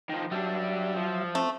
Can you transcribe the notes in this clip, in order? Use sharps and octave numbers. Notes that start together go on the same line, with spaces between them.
D#3 F3
F#3 G3 D4 E5
F3
A3 C4